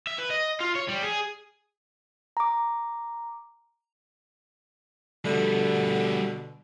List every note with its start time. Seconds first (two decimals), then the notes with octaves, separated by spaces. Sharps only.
0.07 E5
0.18 B4
0.30 D#5
0.60 F4
0.75 C#5
0.88 G3
1.03 G#4
2.37 A#5 D6
5.25 B2 D3 G3 A3